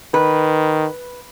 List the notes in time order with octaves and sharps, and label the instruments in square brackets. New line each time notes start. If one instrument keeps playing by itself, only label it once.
[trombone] D#3 [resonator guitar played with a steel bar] B4